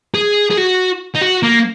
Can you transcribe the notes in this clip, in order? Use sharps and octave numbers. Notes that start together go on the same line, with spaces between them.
G#4
G#4
F#4
D#4
F#4
A#3